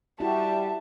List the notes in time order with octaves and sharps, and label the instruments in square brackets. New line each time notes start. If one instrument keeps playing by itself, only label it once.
[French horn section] G3 [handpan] E4 F#4 G4 [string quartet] E5 [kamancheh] A5